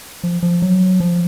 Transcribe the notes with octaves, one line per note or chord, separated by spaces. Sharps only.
F3
F3
F#3
F3